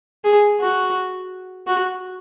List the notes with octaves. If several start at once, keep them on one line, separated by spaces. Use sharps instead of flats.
G#4
F#4
F#4